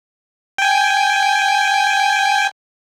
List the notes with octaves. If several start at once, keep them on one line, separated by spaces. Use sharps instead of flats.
G5 G#5